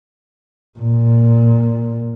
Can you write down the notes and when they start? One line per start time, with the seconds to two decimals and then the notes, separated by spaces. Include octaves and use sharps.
0.79 A#2